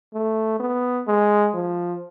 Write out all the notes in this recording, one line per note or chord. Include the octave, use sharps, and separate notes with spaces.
A3
B3
G#3
F3